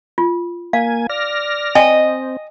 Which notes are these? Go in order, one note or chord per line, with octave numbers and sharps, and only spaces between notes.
F4
A#3 F5 G#5
D5 F6 A#6
C4 D#5 G5 G#5